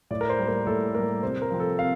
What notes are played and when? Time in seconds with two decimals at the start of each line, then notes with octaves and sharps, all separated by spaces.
0.11 A2 D5
0.21 A#4
0.29 C5
0.39 G3 A#3
0.48 A#4
0.67 A2 A4
0.95 G3 A#3 A#4
1.23 C3 C5
1.42 A#4
1.51 F3 C4
1.60 A4
1.79 C3 F5